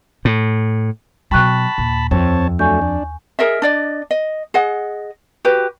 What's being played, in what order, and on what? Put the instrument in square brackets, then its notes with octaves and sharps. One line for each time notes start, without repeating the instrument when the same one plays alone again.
[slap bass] A2
[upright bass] B2 F#3 [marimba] G5 C#6 F#6 [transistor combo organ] A5 B5
[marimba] D#2 [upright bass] A#2
[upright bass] F2 [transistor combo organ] C4 C#5 A5
[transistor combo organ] F#3 A3 D4 [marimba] G#5 C#6 G6
[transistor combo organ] D4
[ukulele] G#4 A#4 D#5 E5
D4 D5 D#5
D#5
G#4 D#5 F#5
F#4 G4 B4